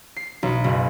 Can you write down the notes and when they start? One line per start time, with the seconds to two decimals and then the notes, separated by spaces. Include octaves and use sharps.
0.16 C7
0.43 B1
0.64 F#1